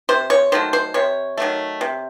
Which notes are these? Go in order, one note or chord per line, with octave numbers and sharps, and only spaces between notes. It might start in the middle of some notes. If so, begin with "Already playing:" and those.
C3 C5
C#5
D#3 F#3 A3 C5
C5
C3 C#5
D#3 F#3 A3
C3